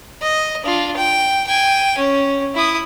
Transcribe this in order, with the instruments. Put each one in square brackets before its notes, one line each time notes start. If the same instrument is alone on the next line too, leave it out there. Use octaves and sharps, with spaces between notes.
[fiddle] D#5
D4 F4
G5
G5 G#5
C#4
E4 D#6